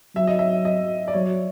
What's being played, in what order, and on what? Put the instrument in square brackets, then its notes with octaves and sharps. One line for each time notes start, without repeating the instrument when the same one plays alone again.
[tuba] F#3 [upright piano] E5
[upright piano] D#5
E5
D#5
D5
[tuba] F#3 [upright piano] C#5